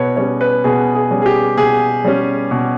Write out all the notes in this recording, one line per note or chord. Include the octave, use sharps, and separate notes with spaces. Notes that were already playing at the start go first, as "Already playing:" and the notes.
Already playing: B2 B4 C#5
G3 C#4 C#5
B4
B2 G#4
G#4
G3 C#4
G#4
G4
B2 G#4
G3 C#4
B2